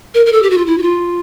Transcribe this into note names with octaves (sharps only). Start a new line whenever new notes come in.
A#4
A#4
A4
G4
F#4
F4
E4
F#4
F4